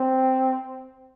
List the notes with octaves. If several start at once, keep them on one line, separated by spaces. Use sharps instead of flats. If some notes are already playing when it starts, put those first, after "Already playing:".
Already playing: C4